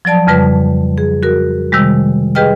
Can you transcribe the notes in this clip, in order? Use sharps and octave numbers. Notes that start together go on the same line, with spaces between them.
F3 F#3 D5 A5
F2 C#3 G3 B4
G#4
F#4 A#4
C3 D#3 G3 G#3
G4 G#4 B4 D#5 G5 F6